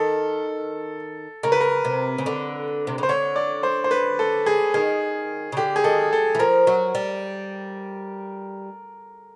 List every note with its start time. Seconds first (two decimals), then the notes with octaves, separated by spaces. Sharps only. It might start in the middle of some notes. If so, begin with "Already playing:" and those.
Already playing: D#3 A4
1.43 C#3 A#4
1.52 B4
1.61 A#4
1.85 C3
2.18 C#3
2.26 D3
2.87 C3
2.98 C#3 C5
3.09 D3 C#5
3.36 D5
3.63 C5
3.84 C5
3.91 B4
4.19 A4
4.46 G#4
4.74 D#3 G#4
5.52 C#3
5.57 D3 G4
5.76 G#4
5.84 D#3 A4
6.13 A4
6.35 E3
6.39 F3 A#4
6.67 F#3
6.95 G3